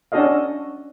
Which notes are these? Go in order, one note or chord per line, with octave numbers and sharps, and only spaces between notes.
C#4 D4 F#4 A4 D#5 F5